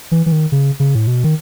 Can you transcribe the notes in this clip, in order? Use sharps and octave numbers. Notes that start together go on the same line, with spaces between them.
E3
E3
D#3
C#3
C#3
A2
B2
D#3